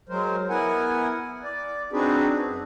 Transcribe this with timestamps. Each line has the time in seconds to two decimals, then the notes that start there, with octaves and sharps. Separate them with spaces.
0.09 F#3 G#3 A#4 C5
0.49 B3 E4 A#4 F#5 G#5
1.44 D5
1.93 C4 D4 D#4 F#4 G#4 B4
2.42 F#2